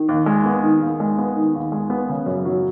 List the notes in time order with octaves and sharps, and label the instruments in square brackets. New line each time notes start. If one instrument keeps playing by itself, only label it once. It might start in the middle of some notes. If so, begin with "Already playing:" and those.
Already playing: [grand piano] D#3
D#2
G#3
B3
D#3
D#2
G#3
B3
D#3
D#2
G#3
B3
C#3
F#2
F#3